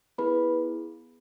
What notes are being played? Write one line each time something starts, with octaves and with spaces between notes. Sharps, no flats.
B3 E4 G#4 B4 B5